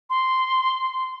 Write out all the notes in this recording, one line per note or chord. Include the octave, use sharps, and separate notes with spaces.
C6